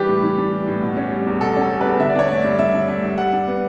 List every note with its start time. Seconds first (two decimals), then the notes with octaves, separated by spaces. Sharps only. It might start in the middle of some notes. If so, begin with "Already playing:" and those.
Already playing: E3 G3 D4 G4 B4
0.08 A2
0.23 E3
0.38 D4
0.52 G3
0.68 A2
0.82 B2
0.97 C#4
1.11 G3
1.26 E2
1.41 B2 A4
1.56 C#4
1.61 A4
1.71 G3
1.81 E2 B4
2.00 D3 E5
2.10 D5
2.15 D4 C#5
2.28 A3 D5
2.44 G2
2.59 D3 E5
2.74 D4
2.88 A3
3.03 G2
3.18 G3 F#5
3.33 D4
3.47 B3